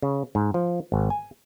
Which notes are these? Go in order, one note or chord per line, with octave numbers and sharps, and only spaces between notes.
C#3
G#2
F3
G#1
G#5